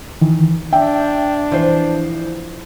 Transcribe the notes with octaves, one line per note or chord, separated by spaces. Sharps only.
D#3 E3
D4 E5 G5
E3 F3 C5